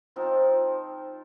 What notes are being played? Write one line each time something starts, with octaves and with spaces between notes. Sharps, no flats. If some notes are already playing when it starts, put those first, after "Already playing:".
F3 C4 D#4 F4